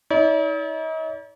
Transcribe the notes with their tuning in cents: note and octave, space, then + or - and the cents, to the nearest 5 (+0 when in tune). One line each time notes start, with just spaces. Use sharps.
D#4 +45 D5 -45